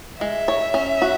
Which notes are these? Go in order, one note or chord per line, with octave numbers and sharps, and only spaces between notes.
G#3 E5
C#5
C#4
F#4